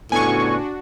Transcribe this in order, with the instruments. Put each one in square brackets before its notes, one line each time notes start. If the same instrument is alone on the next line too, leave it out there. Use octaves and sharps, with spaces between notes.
[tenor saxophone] A2 [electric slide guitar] C#3 B3 [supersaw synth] D4 F#4 [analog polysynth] G#5 C#6